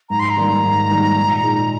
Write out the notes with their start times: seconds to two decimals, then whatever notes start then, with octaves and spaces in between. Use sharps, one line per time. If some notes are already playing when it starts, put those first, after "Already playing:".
0.10 G#2 A#5
0.20 C6
0.30 A#5
0.37 D#3 G3 A#3
0.63 G#2
0.89 D#3 G3 A#3
1.16 A#2
1.43 G#3 D#4